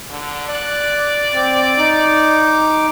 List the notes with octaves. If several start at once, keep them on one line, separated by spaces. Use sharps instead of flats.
D3
D5 F#6
C4
D#4 D6